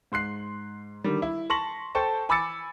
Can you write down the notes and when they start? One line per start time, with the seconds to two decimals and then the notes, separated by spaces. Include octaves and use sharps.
0.12 G#2 C6 F#6 C7
1.04 D3 D#3 G3
1.22 E4
1.50 A5 C6 C#6 A#6 B6 F#7
1.95 A4 C5 G5 A5 C#6
2.29 G#5 B5 D6 E6 A6 C#7